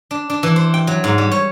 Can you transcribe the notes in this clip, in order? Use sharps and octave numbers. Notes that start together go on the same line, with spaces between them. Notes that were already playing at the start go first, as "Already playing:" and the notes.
D4
D4
E3
C5
G5
F#3
G#2
G3
C#5